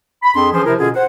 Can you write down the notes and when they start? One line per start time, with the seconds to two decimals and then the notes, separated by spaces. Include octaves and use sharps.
0.23 B5
0.35 F2 C4 D4 G#4 C6
0.52 E3 F3 C#4 G#4 C5
0.65 C3 F3 E4 A#4
0.79 B2 D3 C#4 F4 G#4
0.95 C5 F#5